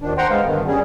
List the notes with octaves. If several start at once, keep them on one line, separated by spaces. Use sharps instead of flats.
D#2 D#3 F3 D4
C5 F#5 G5 A#5 C6
G#3 B3 F5
D2 G2 D#3 B3
G3 C#4 G#4